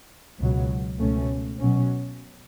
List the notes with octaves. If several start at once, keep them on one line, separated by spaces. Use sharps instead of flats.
C#2 B2 F#3
C#2 B2 A3 C#4
B2 F#3 C#4